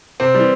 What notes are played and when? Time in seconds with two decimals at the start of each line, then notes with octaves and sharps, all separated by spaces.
0.20 C3 C4
0.34 E3 G3